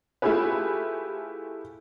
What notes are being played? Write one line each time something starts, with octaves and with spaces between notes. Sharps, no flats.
A3 E4 F4 G4 G#4 B4